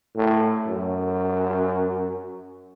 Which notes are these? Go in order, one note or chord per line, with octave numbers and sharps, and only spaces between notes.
A2
F#2